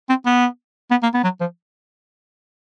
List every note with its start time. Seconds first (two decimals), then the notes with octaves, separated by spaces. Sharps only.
0.09 C4
0.26 B3
0.91 B3
1.03 A#3
1.14 B3
1.24 F#3
1.41 F3